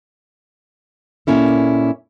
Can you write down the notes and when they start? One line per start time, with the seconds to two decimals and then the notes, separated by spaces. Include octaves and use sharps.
1.27 A#2 G#3 A#3 C#4 E4 A4